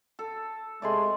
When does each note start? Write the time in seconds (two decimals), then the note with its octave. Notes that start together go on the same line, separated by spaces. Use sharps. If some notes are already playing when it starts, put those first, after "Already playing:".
0.19 A4
0.82 C3 G#3 A3 D5 G#5 C6